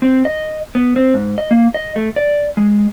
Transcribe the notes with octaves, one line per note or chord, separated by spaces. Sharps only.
C4
D#5
B3
C4
G#2
D#5
A#3
D#5
A3
D5
G#3